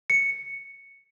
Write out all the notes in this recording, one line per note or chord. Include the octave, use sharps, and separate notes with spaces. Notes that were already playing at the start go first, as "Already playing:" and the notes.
C#7